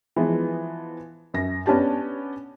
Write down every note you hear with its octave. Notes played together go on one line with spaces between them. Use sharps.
E3 F3 G#3 B3
F#2 A#6
B3 C#4 D4 G4 A5